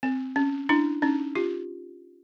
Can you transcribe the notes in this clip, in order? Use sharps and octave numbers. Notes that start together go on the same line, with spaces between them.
C4
C#4
D4 E4
C#4 D#4
F4 G4